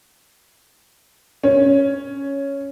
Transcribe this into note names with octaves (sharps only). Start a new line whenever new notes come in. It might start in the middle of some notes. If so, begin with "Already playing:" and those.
C#4